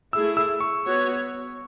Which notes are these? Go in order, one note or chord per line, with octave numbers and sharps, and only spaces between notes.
A3 E4 G#4 E6
E6
C#6
B3 F#4 C#5